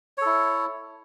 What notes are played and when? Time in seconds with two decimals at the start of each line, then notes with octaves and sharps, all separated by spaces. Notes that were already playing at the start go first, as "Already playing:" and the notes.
0.18 C#5
0.22 A4
0.25 E4